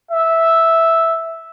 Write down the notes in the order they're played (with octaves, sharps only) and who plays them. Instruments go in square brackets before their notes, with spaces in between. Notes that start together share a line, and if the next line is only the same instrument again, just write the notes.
[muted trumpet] E5